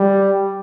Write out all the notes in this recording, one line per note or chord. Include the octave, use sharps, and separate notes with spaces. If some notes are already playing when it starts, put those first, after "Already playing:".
Already playing: G3